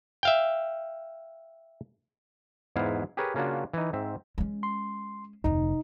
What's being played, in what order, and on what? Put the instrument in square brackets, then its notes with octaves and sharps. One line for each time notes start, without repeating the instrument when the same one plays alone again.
[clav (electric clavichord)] E5 F5 G5
E2 G#2 B3 E4 F5 G#5
G4 G#4 A#4 B4 C#5
C#3 A#3 C#4 D4 F4 F#4
E3 D#4
G#2 C4 E5
[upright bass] G#3 C#4
[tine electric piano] C6
[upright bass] F1 D2 [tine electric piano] D#4